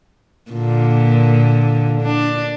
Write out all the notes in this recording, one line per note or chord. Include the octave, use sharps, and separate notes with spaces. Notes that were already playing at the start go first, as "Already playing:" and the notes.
A#2 D3
D4